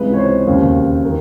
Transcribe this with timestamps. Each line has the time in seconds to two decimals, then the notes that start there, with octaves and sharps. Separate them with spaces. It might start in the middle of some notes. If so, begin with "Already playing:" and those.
Already playing: C#2 C3 E3 G#3 B4
0.13 C#5
0.18 C5
0.46 E1 D#2 C#3
1.05 D#3